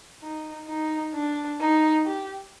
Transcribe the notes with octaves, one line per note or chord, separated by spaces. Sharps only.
D#4
D#4
D4
D#4
G4